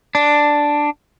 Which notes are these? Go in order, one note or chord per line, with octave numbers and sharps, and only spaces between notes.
D4